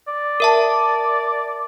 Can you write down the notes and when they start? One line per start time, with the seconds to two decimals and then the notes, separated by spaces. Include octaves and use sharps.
0.08 D5
0.40 A#4 E5 A5